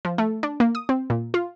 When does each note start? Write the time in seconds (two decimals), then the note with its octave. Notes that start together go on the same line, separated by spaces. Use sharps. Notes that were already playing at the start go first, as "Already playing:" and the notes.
0.05 F3
0.18 A3
0.43 D4
0.60 A#3
0.75 D#6
0.89 C4
1.10 A#2
1.34 F4